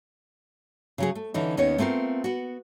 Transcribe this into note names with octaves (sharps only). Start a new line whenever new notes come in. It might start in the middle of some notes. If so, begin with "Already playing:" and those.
C#3 F#3 G#4
A3
D3 E3 C#4 D#4
D#2 D#3 B3 C#4 C#5
A3 B3 C4 F4 A#4
B3 F#4